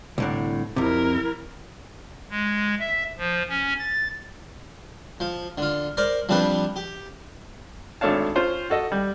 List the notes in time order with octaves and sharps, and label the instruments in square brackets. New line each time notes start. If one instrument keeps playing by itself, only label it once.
[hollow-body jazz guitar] C2 A2 D3
[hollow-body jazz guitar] F2 C3 [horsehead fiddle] E4 A#4
[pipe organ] G#3
E5
F3
C#4
A6
[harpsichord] F3
D3 F4
A#4 C5 D5
F3 G3 C4 D4 G4 B4
G4
[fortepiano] G#1 A3 D4 C#5 F5 A5
C#4 F4 C5
F#4 A4 D#5
G3